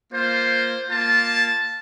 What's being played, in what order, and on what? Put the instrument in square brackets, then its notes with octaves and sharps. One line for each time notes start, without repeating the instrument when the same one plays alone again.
[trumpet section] A#3 F4 C5
A#3 F4 A5